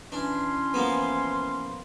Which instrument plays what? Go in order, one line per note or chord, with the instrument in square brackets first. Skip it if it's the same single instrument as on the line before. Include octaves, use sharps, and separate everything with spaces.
[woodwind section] E3 C#4 [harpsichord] D4 [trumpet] C6
[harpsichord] F3 A#3 B3